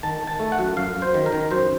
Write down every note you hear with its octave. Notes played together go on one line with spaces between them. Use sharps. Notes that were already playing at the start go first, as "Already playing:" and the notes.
D#3 A5
D#3
A5
A3
F#5
F#2
F#2 F5
F#2
C5
D#3
A#4
D#3
F#2 C5